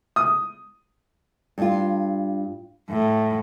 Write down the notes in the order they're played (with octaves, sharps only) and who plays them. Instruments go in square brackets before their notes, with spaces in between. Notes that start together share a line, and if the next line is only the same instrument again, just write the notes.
[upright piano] D#6
[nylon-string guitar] G2 F4
[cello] A2